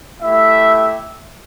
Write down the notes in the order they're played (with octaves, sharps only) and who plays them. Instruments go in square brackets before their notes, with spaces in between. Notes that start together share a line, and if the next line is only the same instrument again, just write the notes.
[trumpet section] A3 E4 G4 E5